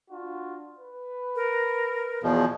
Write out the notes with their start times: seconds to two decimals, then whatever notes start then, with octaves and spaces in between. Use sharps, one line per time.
0.10 D4 F4 F#4
0.78 B4
1.36 A#4
2.23 E2 B2 F3 G#4